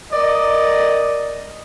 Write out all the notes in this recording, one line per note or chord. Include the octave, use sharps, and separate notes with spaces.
A#4 D5 D#5